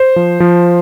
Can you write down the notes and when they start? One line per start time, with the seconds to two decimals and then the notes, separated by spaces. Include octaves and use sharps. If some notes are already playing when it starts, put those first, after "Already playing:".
Already playing: C5
0.16 F3
0.40 F3